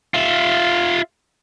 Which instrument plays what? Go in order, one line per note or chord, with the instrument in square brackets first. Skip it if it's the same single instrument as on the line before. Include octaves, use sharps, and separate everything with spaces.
[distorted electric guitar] F4 E5